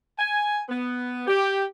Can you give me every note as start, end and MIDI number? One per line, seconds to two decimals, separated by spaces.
0.19 0.60 80
0.69 1.23 59
1.27 1.65 67